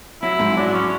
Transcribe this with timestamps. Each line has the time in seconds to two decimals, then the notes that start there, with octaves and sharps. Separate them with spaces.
0.22 F#3 E4
0.39 G#2
0.57 F#3 D4
0.74 C#4